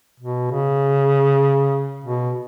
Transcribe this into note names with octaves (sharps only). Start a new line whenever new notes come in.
B2
C#3
B2